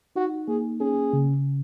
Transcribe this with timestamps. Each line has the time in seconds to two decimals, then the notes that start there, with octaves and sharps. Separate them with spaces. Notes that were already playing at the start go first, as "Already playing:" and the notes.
0.16 D#4 F#4
0.48 A#3 G#4
0.80 C#4 G#4
1.13 C#3